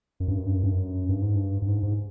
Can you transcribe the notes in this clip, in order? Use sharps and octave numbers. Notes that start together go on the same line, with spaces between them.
F#2
G2
F#2
G2
F#2
G2
F#2
G2
G#2
G2
G2
G#2
G#2